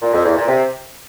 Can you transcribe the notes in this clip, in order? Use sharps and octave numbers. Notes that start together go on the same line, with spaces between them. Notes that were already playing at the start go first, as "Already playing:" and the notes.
A#2
F2
E2
A#2
C3